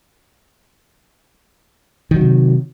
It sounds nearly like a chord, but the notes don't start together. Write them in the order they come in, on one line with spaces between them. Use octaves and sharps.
D#3 F#3 C3